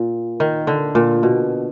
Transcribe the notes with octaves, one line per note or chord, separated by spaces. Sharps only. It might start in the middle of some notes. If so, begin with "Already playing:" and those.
Already playing: A#2
D#3
D3
A#2
B2